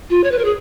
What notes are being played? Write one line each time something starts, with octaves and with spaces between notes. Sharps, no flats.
F4
C#5
B4
A#4
G#4